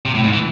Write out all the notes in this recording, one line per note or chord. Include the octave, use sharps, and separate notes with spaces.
C3
A2
G#2
E3